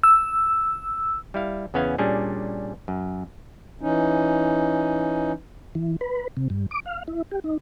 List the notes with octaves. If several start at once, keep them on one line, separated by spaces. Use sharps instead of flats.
E6
G3 E4 F5
E2 C#3 B3 C#4 F5 G#5
A#2 G3 C#4 D4 G#4
F#2
E3 C#4 D#4
E3
B4
C3
G2
D6
F5
E4
G4
D#4